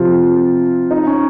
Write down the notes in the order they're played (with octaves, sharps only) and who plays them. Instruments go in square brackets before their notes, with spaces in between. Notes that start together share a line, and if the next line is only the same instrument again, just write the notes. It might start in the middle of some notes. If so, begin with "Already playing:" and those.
Already playing: [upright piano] C3 F3 C4 G4 [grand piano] F4
[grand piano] D#4
C#4